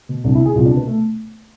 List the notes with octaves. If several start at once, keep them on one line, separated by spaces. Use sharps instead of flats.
B2
C2 D4
E4
B2 G#4
C2 F4
D4
B2
B3
A3